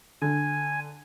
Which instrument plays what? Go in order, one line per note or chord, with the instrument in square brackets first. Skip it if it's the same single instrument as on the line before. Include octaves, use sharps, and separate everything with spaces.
[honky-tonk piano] D3 [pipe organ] G#5